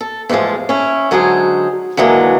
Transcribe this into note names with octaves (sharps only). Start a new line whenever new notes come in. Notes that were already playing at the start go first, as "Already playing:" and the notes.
A4
E2 A2 D#3 F3 G#3
C#4 E4
D3 F#3 G#3 D#4 G#4 C5
D3 E3 F#3 G#3 A#3